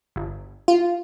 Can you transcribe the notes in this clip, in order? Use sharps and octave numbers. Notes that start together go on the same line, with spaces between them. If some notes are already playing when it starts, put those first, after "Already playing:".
G1
F4